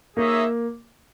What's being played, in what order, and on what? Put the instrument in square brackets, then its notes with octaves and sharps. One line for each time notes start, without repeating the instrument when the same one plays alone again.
[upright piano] A#3 [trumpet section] D#4 G#4 C#5 E5